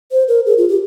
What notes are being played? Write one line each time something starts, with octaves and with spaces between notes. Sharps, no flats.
C5
A#4
G#4
F4
G4